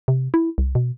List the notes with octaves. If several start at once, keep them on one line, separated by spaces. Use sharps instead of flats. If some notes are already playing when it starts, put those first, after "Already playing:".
C3
E4
C2
B2